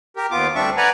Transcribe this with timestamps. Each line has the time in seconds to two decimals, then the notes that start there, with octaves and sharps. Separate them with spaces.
0.17 G4 A#4
0.31 D#2 B3 F4 D6
0.55 D2 G3 C4 D4 E5 C#6
0.77 B4 D5 F#5 G#5 A#5